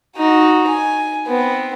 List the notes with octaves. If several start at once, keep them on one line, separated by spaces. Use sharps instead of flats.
D#4 F#4
G#5
B3 C4